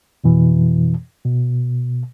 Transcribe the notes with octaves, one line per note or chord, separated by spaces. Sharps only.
F2 B2 E3
B2